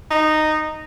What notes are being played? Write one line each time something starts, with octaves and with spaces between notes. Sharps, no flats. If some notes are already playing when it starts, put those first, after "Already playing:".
D#4